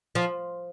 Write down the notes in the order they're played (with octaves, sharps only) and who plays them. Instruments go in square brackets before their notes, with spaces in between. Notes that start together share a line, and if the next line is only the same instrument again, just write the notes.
[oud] F3